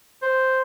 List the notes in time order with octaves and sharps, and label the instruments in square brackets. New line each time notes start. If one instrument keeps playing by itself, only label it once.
[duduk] C5